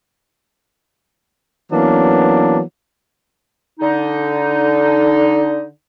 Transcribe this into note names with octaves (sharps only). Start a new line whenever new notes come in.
E3 F#3 A#3 B3 C#4 D4
D3 D#4